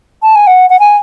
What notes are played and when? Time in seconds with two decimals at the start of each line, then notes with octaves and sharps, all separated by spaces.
0.23 A5
0.35 G#5
0.47 F#5
0.70 F#5
0.80 G#5